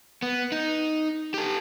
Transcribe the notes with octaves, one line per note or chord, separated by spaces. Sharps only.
B3
D#4
G4 A4